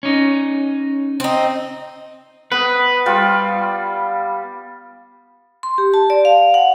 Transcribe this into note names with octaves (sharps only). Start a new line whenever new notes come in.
C#4 D#4
C4 D#4
B3 B4
G3 F4 G5
C6
G4
A5
D5
F5
F#5